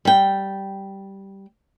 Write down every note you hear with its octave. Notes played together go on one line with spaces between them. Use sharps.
G3 G5